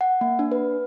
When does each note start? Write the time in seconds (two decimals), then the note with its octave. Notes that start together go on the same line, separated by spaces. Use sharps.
0.01 F#5
0.21 A#3
0.39 D4
0.52 B4